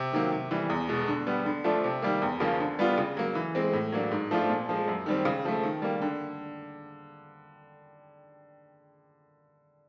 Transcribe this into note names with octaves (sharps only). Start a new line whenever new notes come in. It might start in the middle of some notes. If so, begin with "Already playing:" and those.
Already playing: C3
D#3 F#3 A#3
C3
E3 G3
E2
B2 G#3
D3
G3 B3
D3
F3 A3 D4 F4
C3
D#3 G3 A#3
E2
C#3 F3 A#3 C#4
D3
G3 B3 D4 F4
C#3
F#3 A#3
E3
G#3 C4
A2
F#3 A#3 D4
G#2
F3 A3 D4 F4
A#2
F3 G#3
F#2
D#3 G3 C4
C#3
F3 A3
D#3
G3 A#3
D3